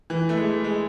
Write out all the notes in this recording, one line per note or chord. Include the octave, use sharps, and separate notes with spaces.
E3
A3
G#3
G#3